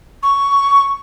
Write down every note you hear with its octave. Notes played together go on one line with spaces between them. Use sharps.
C#6